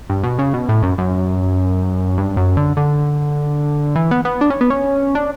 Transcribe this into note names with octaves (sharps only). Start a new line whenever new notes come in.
G2
B2
C#3
B2
A2
F#2
F#2
G2
F#2
D3
D3
E3
B3
B3
D4
C#4
B3
C#4
D4